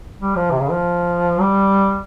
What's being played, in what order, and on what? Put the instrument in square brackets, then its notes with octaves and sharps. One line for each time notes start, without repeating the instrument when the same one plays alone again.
[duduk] G3
F3
C3
C#3
F3
G3